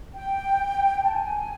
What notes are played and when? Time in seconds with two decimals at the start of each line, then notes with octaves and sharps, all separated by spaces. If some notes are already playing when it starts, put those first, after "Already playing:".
0.16 G5
1.03 A5
1.14 G#5